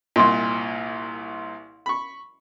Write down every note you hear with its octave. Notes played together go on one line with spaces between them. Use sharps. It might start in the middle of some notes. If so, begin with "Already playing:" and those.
C2 A#2 D#5 E5 C6
B5 C#6